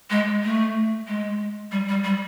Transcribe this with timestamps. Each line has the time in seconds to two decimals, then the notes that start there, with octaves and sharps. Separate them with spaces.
0.10 G#3
0.44 A3
1.08 G#3
1.71 G3
1.89 G3
2.04 G3